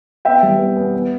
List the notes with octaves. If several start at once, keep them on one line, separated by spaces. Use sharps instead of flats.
B3 E5 G5
G3
B3
B3
B3